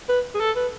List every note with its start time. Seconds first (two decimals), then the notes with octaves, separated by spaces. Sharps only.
0.09 B4
0.35 G#4
0.40 A4
0.56 B4